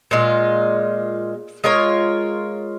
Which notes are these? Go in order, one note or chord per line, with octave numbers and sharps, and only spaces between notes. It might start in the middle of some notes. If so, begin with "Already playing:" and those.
A#2 G#3 F4
G#3 F4 A#4 C#5